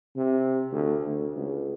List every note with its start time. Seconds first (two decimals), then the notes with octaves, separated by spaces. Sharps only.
0.16 C3
0.72 D2
1.06 D2
1.36 C#2